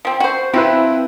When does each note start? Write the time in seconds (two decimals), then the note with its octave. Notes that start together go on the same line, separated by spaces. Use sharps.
0.05 F3 C4
0.20 F#4 C5
0.54 F3 C4 E4 B4